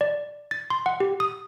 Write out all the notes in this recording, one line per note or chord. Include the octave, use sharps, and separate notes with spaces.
D5
A6
C6
F#5
G4
D#6